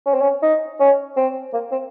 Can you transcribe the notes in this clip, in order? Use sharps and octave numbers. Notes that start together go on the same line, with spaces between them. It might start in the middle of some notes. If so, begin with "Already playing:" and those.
C#4
C4
C#4
D#4
C#4
C4
A#3
C4